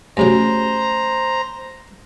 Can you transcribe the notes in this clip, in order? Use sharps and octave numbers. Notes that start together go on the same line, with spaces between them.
G2 C3 F#3 A3 C#4 G#4 C5 A#5